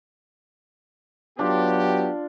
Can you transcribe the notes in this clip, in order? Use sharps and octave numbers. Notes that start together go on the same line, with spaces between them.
F#3 B3 D4 F4 G4